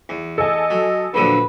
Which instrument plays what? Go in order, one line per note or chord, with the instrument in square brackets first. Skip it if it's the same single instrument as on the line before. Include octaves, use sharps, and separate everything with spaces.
[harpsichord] E2
[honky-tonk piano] A4 G#5 [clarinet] D#5
[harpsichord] F#3
[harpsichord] A#1 D3 F#3 [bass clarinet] B4